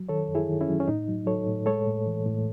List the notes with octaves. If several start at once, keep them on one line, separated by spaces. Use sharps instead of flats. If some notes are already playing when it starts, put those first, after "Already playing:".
Already playing: F#3
D#3 A4 C#5
F#2
E4 G#4
D#3
C#4 E4
F#3
C#4
A2 D#4
F#3
F#3 A4 C#5
A2
G#3 A4 C#5
A2
E3
A2